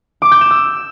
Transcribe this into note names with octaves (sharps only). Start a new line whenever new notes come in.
D6
G6
E7
E6